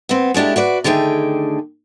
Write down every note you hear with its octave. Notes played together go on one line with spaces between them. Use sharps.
B3 C4
G#3 A3 D4 E4 G4
F#4 B4 D5
D3 D#3 A3 G#4 G5